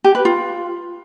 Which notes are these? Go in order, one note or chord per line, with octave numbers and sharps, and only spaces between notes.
G4
B4
F4